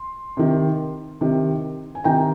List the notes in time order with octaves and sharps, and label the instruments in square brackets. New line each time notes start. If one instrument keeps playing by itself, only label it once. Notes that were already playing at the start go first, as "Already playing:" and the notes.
Already playing: [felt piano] C6
C3 D#3
C3 D#3
G#5
C3 D#3 G5 A#5